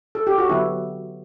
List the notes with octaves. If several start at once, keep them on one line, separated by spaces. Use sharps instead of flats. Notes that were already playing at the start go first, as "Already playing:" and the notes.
A4
G4
F#4
D3 F#3 B3 E4